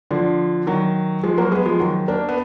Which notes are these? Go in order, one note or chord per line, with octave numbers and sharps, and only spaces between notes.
D3 F3
D#3 F#3
F3 G#3
F#3 A#3
G#3 B3
F3 G#3
D#3 F#3
A#3 D4
B3